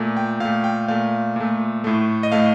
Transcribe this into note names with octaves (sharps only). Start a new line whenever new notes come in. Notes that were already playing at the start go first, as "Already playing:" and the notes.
Already playing: A#2 A3
G5
A#2 A3 F5
G5
A#2 A3 F5
A#2 A3
A2 A3
D#5
A2 A3 F5